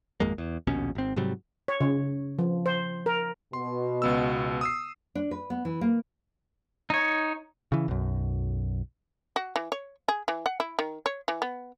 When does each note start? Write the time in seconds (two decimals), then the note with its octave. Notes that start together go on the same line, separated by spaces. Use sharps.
0.20 G#1 F2 G#3 A#3
0.38 E2
0.67 A#1 D#2 B2 C#4
0.95 G#1 C4
1.16 G#2 C3 F#3 G3
1.68 C#5
1.81 C#3
2.39 F3
2.66 C5
3.06 A#4
3.53 B2 C6
4.02 C#2 B3 E6
4.61 D#6 E6 C7
5.15 D4
5.31 B4
5.50 B3
5.65 E3
5.81 A#3
6.90 D#4 C#5
7.72 C#3 E3
7.88 B1 F#2
9.36 F#4
9.56 E3
9.72 C#5
10.08 G#4
10.28 E3
10.46 F#5
10.60 E4
10.79 D#3
11.06 C#5
11.28 E3
11.42 B3